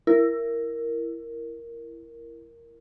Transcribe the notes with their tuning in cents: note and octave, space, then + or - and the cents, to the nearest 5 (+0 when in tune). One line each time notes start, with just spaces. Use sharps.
E4 +15 A#4 +0